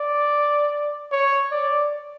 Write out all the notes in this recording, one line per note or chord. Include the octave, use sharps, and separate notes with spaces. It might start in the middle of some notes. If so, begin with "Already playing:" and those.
Already playing: D5
C#5
D5